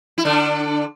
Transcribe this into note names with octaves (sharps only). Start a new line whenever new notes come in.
E4
D3 D4